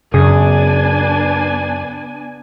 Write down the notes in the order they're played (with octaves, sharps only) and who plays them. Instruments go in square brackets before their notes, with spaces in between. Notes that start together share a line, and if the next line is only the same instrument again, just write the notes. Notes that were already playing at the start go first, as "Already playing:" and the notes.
[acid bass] F#2 [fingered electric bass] C#3 [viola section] B3 D4 G#5 [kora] G#4